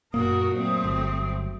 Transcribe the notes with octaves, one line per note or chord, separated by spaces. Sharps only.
F#2 A#2 A#3 F#4 A#4 D#6
A#2 F#3 A3 C4
G1